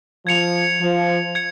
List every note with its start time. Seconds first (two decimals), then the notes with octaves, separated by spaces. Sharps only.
0.26 F3 G#6 C#7 F7
0.81 F3
1.35 G#6 C#7